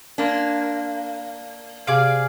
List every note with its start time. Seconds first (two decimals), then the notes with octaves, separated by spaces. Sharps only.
0.18 A#3 D4 F5 C6 G#6
1.87 C3 G#4 D5 F5